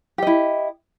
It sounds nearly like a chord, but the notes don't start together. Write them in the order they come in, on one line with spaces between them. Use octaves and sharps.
G4 D#5 E4